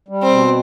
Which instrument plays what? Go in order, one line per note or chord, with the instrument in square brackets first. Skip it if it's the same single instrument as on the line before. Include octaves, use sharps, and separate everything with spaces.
[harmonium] G3
[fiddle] C4
[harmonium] B2